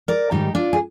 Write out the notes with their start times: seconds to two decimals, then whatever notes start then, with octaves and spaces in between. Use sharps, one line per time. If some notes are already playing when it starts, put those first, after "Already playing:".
0.08 A#4 D5
0.31 G#2 D#3 G3 D#4 G4
0.55 D4 F4
0.73 G#4